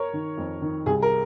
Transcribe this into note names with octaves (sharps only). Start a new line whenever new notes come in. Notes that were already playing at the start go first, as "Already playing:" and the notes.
Already playing: A#4 C#5
D#3
F2
D#3
C2 G#4
A#4